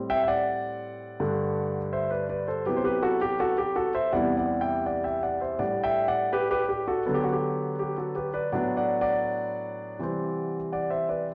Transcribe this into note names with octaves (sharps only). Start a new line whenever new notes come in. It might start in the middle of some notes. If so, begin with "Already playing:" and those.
Already playing: A2 G3 C4
E5 G5
G5
D5 F#5
G2 D3 A3
C5 E5
B4 D5
B4 D5
A4 C5
C3 F#3 B3 E4 G4 B4
C5
G4 B4
F#4 A4
G4
F#4 A4
G4
F#4 A4
C5 E5
E2 C3 G3 B3 E4 D5 F#5
D5 F#5
E5 G5
D5 F#5
E5 G5
D5 F#5
C5 E5
A2 G3 D4 D5 F#5
E5 G5
D5 F#5
G4 B4
G4 B4
G4
F#4 A4
D3 F#3 B3 A4
G4
F#4
G4
G4
F#4 A4
G4 B4
B4 D5
A2 F#3 B3 D4 D5 F#5
D5 F#5
D5 F#5
C3 E3 G3 C4
D5 F#5
C5 E5
B4 D5